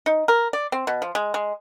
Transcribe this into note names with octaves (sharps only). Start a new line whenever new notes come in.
D#4
A#4
D5
C4
B2
F3
G#3
G#3